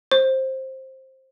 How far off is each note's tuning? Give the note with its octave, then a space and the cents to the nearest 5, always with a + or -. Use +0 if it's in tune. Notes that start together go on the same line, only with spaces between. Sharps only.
C5 +15